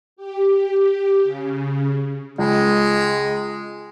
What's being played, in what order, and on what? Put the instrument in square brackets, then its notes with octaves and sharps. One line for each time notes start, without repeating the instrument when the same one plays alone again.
[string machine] G4
C#3
[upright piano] C#2 [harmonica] G#3